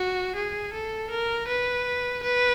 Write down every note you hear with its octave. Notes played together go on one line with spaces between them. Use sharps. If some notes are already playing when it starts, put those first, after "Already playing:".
Already playing: F#4
G#4
A4
A#4
B4
B4